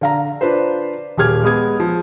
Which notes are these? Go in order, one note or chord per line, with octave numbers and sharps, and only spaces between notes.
D3 F5 A#5
D4 F4 B4 C5
D#1 G4 G#4 F6 G#6
G#3 B3 D#6 G#6
F3